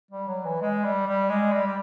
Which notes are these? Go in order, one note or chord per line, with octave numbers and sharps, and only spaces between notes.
G3
F#3
E3
G#3
G3
G3
G#3
G3
G3